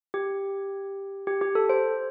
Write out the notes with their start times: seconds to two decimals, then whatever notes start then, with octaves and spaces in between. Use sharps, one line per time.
0.14 G4
1.27 G4
1.41 G4
1.55 A4
1.69 C5